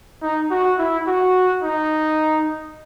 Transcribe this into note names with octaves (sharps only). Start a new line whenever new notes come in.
D#4
F#4
E4
F#4
D#4